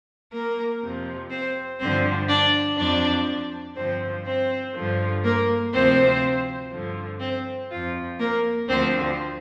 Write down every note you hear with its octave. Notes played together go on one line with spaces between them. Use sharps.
A#3 A#4
F2 C3 F3
C4 C5
G2 D3 F3 C4 C5
D4 D5
F2 F3 D4 D5
G2 D3 F3 C4 C5
C4 C5
G2 D3 F3
A#3 A#4
D2 C3 F3 C4 C5
G2 D3 F3
C4 C5
F2 F3 F4
A#3 A#4
D2 D3 F3 C4 C5